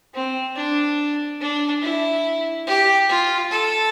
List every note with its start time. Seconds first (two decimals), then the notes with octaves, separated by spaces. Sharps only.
0.14 C4
0.56 D4
1.41 D4
1.83 E4
2.67 G4
3.09 F4
3.51 A4